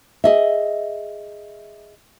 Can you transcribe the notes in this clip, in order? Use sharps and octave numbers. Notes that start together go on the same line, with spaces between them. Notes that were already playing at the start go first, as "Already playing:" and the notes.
G#4 D#5 E5